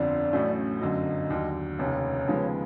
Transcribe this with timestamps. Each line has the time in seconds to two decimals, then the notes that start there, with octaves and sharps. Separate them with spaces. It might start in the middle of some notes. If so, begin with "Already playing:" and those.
Already playing: G1 F2 D3 D5
0.33 A1 A2 F#3 A3 C#4
0.81 G1 F#2 D3 F#3 D#5
1.30 D#2 D3 F#3
1.79 F1 D#2 C#3 C#5
2.28 D#2 C#3 F3 G#3 B3